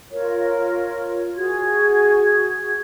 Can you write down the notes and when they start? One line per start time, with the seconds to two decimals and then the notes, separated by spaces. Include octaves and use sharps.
0.12 F4 A#4 C#5
1.36 F#4 G#4 G#6